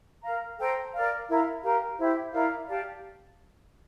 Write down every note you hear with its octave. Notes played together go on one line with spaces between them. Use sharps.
A#4 F5 A#5
A4 C5 G5 A#5
A#4 D5 F5
E4 A#4 F5
G4 A#4 F5
E4 G4 C5
E4 A#4 D5 F5
G4 D5 F5 A5